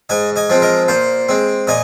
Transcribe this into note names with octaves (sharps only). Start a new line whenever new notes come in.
G#2 D#5 G#5
D#5 G#5
F3 G#3 C4
A#4 D#5
A#2 C5 F5
G#3 C4
A#2 D#5 G#5